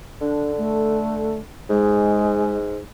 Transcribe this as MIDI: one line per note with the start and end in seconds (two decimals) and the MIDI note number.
0.21 1.39 50
0.21 0.52 62
0.58 1.40 57
1.69 2.80 44
1.69 2.57 56